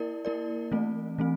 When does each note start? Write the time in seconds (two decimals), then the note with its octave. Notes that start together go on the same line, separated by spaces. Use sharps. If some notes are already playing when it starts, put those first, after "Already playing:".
Already playing: A#3 E4 A#4 D5
0.25 A#3 E4 A#4 D5
0.72 E3 A3 C4
1.19 E3 A3 C4